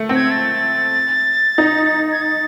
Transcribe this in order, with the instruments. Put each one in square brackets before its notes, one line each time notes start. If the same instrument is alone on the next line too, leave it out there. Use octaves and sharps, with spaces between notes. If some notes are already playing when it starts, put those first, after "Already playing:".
Already playing: [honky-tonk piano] A3
C4
[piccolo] G#6
A6
[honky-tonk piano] D#4
[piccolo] G#6
A6